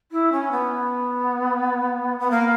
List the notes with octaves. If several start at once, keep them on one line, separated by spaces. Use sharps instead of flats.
E4
C#4
B3
B3
A#3